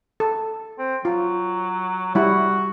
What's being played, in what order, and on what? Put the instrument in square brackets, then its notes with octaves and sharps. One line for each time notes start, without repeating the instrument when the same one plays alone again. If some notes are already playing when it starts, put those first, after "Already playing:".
[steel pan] A4
[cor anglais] C4
[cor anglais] F#3 [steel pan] F4
[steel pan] G3 E4 [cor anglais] F#4